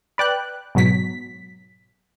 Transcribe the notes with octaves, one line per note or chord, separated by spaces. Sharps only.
B4 D5 G5 F#6
G#2 B2 F#3 B6